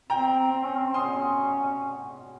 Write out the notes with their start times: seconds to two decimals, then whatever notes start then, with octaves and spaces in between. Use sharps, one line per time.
0.10 C4 G5 A#5
0.53 C4
0.64 C#4
0.77 C4
0.94 C#4 C6 D#6